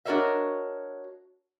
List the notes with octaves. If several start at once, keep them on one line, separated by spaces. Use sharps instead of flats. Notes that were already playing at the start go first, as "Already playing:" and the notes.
D4 F#4 A#4 C#5 D#5 E5